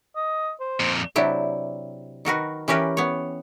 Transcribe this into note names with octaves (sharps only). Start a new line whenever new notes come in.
D#5
C5
F2 A#2
C3 F#3 D4 E4 G4
D#3 F#4 A#4 B4
E3 C#4 G4 A#4 B4
B3 C#5